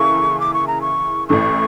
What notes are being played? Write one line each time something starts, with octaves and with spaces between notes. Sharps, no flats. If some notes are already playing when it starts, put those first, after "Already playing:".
Already playing: C#3 E3 A#3 E4 A4 C#6
D6
C#6
A#5
C#6
A1 A2 E3 A3 C#6